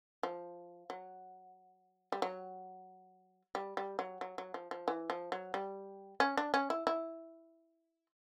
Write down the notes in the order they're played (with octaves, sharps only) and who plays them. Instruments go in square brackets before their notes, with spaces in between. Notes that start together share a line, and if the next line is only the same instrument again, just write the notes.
[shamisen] F3
F#3
G3
F#3
G3
G3
F#3
F#3
F#3
F3
F3
E3
F3
F#3
G3
C#4
D4
C#4
E4
E4